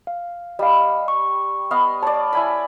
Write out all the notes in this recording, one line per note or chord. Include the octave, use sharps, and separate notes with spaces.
F5
G3 D#5 F5
C#6
B3 D#5 F5
C#5 D5 A5
E4 G#5 B5